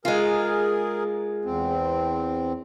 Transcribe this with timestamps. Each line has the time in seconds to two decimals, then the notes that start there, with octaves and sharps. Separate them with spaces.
0.05 G#3 F4 G#4 A#4
1.45 E2 C4